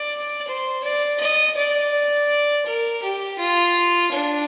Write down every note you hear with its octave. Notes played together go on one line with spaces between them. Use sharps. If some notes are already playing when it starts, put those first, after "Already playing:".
Already playing: D5
C5
D5
D#5
D5
A#4
G4
F4
D4